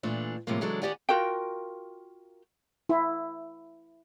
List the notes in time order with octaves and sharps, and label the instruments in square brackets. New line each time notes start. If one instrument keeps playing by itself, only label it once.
[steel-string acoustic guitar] A#2 E3 A3 D4 F4
A2 C3 F3 G#3 A#3
C#3 E3 F#3 G#3 D4 A4
D#3 F#3 G4 D5 F#5 G#5
[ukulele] F4 F#4 A#4 G5
[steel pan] E4